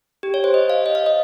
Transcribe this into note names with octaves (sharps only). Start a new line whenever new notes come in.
G4
C#5
C5
D#5
F5
D#5
F5
D#5